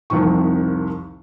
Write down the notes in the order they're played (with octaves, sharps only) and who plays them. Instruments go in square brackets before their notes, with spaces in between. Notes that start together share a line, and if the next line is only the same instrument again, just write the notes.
[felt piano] C2 F2 C3 D#3 C#6